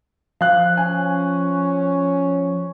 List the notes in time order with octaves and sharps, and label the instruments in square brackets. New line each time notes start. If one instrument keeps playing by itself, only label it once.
[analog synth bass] F3 [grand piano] F5 F#6
[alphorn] C#4 [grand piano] G#5